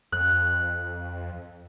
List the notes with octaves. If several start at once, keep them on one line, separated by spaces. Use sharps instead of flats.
F2 F#6